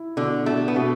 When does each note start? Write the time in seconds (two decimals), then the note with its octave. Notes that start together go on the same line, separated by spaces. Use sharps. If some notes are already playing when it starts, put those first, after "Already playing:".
Already playing: E4
0.17 B2 D3
0.46 B2 A3
0.68 B3
0.76 B2 A3